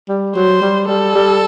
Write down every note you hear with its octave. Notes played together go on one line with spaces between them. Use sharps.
G3
F#3 C5
G3
G3 A4
G3